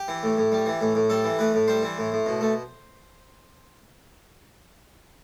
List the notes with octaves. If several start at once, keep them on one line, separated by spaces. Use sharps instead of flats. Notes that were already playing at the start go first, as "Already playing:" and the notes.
Already playing: G4
E3
A2
A2
G3
E3
A2
A2
G3 A4
E3
A2 B4
A2
G3 C5
E3
A2
A2
B2
A3